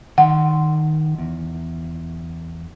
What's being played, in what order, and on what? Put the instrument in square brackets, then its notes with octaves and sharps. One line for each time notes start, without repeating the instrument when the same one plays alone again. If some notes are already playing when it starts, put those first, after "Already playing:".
[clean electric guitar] D#3 C6 [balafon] F#5
[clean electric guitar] E2